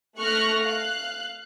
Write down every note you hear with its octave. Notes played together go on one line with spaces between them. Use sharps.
A3 C#6 F6 F#6 A#6
F5 F#6